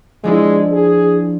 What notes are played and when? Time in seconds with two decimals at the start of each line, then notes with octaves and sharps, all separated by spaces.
0.24 F3 G#3 D4 E4
0.72 G#4